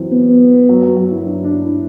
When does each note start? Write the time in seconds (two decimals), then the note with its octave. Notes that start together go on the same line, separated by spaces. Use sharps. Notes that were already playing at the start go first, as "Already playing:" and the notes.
Already playing: E3 F#3 C4
0.12 B3
0.69 F#3
0.82 F#3
0.97 F#3
1.11 E4
1.26 D4
1.44 D4
1.64 E4